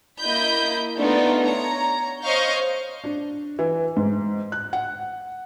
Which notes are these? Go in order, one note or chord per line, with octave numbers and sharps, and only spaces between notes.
A#3 E4 D#5 B5 G6
A3 B3 D4 D#4 F4
C#5 A#5
C5 C#5 D#5 F5 C#6 G6
D4
E3
G#2
F#6
F#5